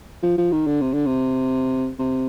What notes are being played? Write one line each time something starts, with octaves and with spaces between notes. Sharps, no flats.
F3
F3
D#3
D3
C3
D3
C3
C3